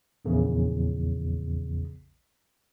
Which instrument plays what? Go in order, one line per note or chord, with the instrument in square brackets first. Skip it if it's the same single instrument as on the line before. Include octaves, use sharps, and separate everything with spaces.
[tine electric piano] A#1 E2 C#3